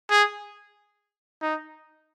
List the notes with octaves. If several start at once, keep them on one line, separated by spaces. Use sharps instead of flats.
G#4
D#4